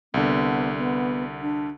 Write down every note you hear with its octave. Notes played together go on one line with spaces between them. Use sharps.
C2 D3 B3
B3
D4